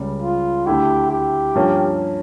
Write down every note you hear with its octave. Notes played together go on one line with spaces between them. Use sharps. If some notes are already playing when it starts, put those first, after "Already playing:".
Already playing: C#2 C#3 G3
F4
D2 D3 A3 E4 G4
G4
G2 F3 A#3 C#4